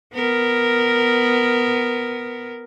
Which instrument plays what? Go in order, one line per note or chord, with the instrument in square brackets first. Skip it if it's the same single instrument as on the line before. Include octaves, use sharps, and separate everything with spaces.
[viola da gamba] B3 A#4